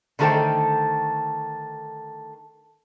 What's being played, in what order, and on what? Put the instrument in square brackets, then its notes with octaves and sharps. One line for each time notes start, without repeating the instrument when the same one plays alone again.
[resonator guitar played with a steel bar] D3 D#3 A3 A4 C5 G5